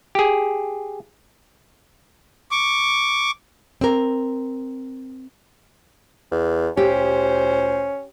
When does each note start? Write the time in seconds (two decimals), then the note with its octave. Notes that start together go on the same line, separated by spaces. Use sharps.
0.15 G4 G#4
2.51 C#6 D6
3.81 C4 A#4
6.32 E2
6.77 D2 A#2 C#4 G4 C5